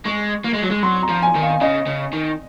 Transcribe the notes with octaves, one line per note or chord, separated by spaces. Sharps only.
G#3 C#6
A#3
G#3
F#3
G#3
F#3 C6
A#5
F3
G#5
D#3
F5
C#3 D#5
C#3
D#3